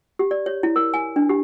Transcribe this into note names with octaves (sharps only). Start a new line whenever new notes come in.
G4
D5
C#5
E4
A#4
G#5
D4
G4